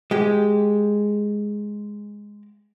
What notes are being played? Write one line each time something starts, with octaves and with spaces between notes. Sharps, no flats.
G#3 G4